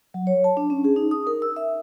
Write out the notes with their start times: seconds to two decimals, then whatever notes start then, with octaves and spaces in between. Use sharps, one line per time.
0.14 F#3
0.27 C#5
0.44 A5
0.57 D4
0.70 C#4
0.84 G#4
0.96 D#4
1.11 D#6
1.27 A#4
1.42 E6
1.56 E5